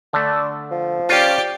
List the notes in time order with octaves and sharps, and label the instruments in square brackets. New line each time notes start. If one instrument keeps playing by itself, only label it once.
[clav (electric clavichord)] D3 A3 [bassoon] D4
[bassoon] F3
[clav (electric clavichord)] C#4 F4 [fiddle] G4 D5